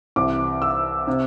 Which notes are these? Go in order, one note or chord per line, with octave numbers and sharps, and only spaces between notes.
C2 C3 E3 D6
E6
C3